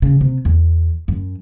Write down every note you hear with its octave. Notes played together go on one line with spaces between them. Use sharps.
C#3
C3
E2
F#2